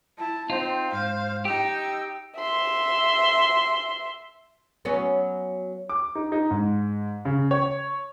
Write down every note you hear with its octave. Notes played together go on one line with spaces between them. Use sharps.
E4 A5
C4 D#4 F4 C5
G#2 F5
D#4 G4 G5 E6
E5 C6
F#3 B3 C#4
D6
D#4
D#4
G#2
C#3
C#5